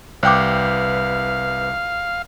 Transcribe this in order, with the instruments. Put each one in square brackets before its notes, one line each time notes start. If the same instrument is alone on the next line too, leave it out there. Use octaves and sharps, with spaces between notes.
[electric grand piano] C2 G6 [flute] B4 [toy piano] C5 G5 D6 [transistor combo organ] F5